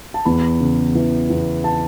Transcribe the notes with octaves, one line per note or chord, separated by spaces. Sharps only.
A5
E2 B5
C#3
E3
E2
A5